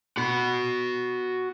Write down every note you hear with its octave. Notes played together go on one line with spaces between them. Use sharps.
F#4 B5